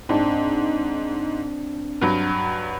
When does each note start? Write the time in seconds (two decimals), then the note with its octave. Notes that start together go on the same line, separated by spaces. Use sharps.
0.09 G#2 C4 D4
2.01 G2 F#3